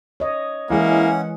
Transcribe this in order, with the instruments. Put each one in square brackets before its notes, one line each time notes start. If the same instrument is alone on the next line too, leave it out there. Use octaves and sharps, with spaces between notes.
[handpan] C#5 D#5
[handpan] E3 G#3 G#4 [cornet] A#3 [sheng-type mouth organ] C#4 F#5 [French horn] E4